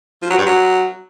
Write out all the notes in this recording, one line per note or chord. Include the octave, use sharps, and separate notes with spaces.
F3
F#3
G2
F#3